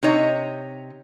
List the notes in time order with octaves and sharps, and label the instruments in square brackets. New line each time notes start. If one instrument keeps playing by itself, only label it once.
[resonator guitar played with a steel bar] C3 D#4 C#5 D#5